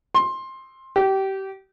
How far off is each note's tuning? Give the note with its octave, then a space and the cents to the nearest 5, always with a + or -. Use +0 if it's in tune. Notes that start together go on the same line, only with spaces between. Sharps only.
C6 +15
G4 -25